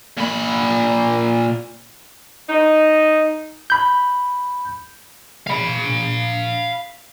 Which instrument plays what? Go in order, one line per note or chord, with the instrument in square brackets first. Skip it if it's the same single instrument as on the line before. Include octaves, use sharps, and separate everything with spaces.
[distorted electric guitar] A#2 B5
[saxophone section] D#4
[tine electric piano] B5 G6
[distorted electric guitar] F5 B5